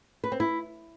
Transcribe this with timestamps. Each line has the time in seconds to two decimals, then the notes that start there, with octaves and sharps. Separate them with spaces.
0.24 B4
0.32 C4
0.40 E4